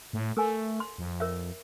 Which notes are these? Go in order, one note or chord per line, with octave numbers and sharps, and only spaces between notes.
A2
A3 A4 A#4 G#5
C6
F2
A#4 C#5 E5